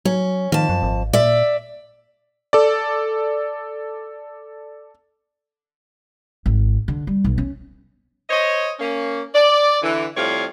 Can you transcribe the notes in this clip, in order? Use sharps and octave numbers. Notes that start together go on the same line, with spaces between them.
F#3 C#4
F2 D#3 A5
F#2
G#1
A#2 D5 E5
A4 D5
G#1
D3
G3
B1
C#4
C5 C#5 D#5
A#3 C#4
D5
D3 E3
A2 F3 G3 C4 C#5 F5